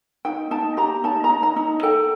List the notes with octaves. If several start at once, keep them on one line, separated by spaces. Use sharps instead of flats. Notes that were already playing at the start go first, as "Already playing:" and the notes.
D#4 G5
D#4 A5
G4 A#5
D#4 A5
A#5
D#4
A#5
D#4
A4 G5